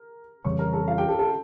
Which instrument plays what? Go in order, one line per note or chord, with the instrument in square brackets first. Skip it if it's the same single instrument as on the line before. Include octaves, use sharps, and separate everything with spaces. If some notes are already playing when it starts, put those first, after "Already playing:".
Already playing: [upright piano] A#4
[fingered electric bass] F2 C#3 E3 G3 [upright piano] C#5 C#6
[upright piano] A#4 A#5
A4 A5
F4 F5
G4 G5
A4 A5
A4 A5